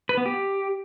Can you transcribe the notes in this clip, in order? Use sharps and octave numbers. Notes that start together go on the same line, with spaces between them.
B4
B3
G4